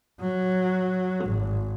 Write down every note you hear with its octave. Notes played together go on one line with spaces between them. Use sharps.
F#3
G#1